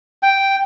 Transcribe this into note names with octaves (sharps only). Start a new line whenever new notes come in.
G5